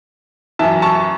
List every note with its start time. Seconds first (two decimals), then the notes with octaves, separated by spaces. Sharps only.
0.59 E3 E5 A5
0.63 F#2
0.82 A5 C#6